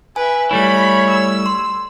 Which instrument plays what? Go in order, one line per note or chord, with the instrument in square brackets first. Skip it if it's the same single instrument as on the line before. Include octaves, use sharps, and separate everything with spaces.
[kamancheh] B4 E5 [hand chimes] G#5
[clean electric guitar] G3 A3 E4 [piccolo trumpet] C#5 [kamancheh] B5
[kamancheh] E6
[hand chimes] C6